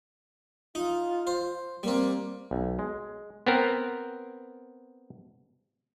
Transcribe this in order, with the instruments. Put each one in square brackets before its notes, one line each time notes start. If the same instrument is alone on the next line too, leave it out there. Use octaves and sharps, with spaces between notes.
[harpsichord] D#4 [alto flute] F4
[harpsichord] C5
[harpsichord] G3 C4 [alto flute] A#3
[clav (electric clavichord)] B1
G#3
B3 C4 A#4